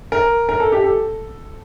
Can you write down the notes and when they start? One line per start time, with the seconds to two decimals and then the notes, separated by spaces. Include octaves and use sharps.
0.12 A#4
0.49 A#4
0.60 A4
0.72 G4
0.84 A4